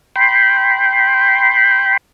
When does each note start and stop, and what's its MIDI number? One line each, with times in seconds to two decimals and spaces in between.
0.16 1.97 79
0.16 1.97 83
0.16 1.97 84